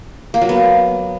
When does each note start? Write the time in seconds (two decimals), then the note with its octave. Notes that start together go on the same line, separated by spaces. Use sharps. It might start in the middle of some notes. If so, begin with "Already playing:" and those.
0.34 A#3
0.41 F#3
0.49 B3